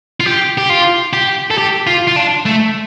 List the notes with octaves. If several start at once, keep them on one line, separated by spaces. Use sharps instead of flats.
F4
G4
G4
F4
G4
A4
G4
F4
F4
D4
A3